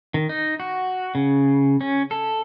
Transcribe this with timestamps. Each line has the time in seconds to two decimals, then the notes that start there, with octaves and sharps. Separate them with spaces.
0.14 D#3
0.29 D#4
0.60 F#4
1.15 C#3
1.81 C#4
2.11 A4